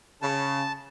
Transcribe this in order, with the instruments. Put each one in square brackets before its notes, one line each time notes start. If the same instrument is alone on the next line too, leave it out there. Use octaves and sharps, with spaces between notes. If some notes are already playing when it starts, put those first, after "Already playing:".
[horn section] C#3 [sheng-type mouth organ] A5